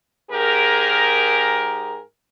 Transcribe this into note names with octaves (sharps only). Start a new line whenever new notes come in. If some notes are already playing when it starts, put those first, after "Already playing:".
G#2 G4 G#4 A#4